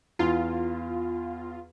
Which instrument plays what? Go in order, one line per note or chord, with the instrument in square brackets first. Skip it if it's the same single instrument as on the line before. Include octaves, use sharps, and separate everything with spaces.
[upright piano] E2 [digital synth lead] F4